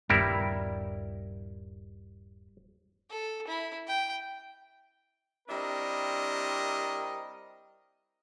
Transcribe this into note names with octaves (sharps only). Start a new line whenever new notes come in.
D#1 G2 G3 B3 E4 A#4
A4
E4
G5
G3 C4 D4 E4 A#4 D#5